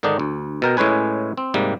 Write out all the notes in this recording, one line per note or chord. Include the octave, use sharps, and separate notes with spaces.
G#2 D3 D#3 D4 D#4
D2
B2 A#4 G5
A2 G#3 C#4 B4 G#5
C4
G#2 C3 G3 A#3